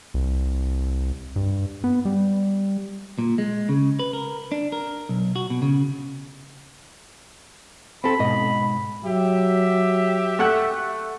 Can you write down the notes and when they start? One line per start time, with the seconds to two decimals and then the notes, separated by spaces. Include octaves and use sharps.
0.14 C2
1.36 G2
1.84 B3
2.05 G3
3.19 A#2
3.38 G#3
3.69 C#3
3.99 B4
4.13 A#4
4.52 D4
4.72 A#4
5.09 B1
5.36 F#4
5.50 B2
5.62 C#3
8.04 C4 A4 B5
8.19 G#2 B2 D#5
9.05 F#3 G4 E5
10.39 A3 F#5 F#6